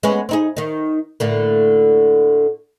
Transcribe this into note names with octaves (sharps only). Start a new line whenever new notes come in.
G#3 B3 C#4
C4 D#4 G#4
D#3 D#4
A2 D3 A#3